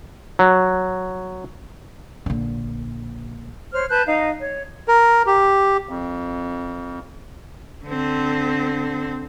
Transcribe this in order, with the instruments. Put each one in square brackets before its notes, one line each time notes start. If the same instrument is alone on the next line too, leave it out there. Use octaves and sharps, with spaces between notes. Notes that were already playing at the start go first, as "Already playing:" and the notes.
[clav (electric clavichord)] F#3
[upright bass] A#1 D3
[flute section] C5 C#5 F6
B4 A5 F#6 G6
D#4 D#5 F5
C#5
[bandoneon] A#4
G4
F2
[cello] D3 C4